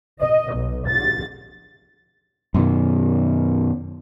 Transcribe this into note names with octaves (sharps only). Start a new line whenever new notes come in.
D#5
B1
A6
F#2 B2 D#3